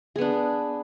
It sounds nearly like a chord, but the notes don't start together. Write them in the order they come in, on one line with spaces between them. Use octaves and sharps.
G#4 B3 D4